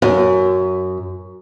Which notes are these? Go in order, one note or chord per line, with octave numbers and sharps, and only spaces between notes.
F#2